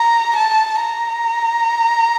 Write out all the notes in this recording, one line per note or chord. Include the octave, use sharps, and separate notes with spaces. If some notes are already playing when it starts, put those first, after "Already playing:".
Already playing: A#5
A5
A#5